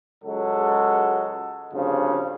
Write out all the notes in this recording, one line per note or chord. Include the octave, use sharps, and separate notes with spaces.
C#2 F#3 G#3 F#4 A4
D2 G2 C#3 F3 C4